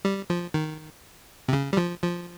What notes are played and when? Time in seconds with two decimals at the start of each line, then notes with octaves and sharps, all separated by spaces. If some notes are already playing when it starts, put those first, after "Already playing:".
0.05 G3
0.30 F3
0.54 D#3
1.48 C3
1.53 C#3
1.73 G3
1.77 F3
2.02 F3